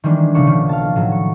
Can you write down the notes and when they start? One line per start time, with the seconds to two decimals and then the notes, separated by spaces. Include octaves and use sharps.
0.04 D#3 E3 G3 G#3 A#3 D4
0.35 B1 C#3 F3 A3 D4 C#6
0.47 D#3 F3
0.69 F5 A5
0.96 A2 F#3
1.12 C#6